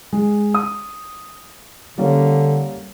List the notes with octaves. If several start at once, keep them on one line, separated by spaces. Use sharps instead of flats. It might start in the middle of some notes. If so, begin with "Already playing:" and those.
G#3
D#6
D3 G3 A#3 C#4